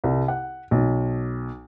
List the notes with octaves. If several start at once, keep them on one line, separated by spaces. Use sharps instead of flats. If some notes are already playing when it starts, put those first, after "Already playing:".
C2
F#5
B1